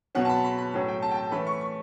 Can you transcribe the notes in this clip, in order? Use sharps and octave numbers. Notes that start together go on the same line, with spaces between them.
B2 F#3 C#4 F#5
A5
B5
B5
B5
A2 F#3 C#4
G5
A5
G5
A5
E3 A3 C#4 B5
C#6
C#6